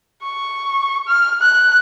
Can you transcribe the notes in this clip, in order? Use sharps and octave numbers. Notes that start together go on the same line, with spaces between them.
C#6
F6
F#6